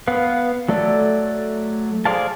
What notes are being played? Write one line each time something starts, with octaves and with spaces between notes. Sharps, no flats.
B3 B4 F5
F#3 A3 A4 D5
G#4 C5 D5 F5 A5